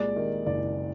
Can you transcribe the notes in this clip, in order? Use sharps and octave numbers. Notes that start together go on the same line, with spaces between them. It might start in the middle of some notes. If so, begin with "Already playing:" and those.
Already playing: C2 A#2 G#3 D5
D#3
F#1 D5